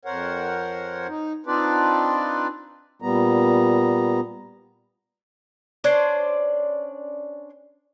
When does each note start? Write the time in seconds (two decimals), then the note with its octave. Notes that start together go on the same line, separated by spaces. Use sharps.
0.05 F2 A#4 C5 C#5 F#5
1.08 D#4
1.46 C4 D4 D#4 F4 B4 D5
3.02 A#2 G3 B3 A#5
5.84 C#4 D4 C5 D5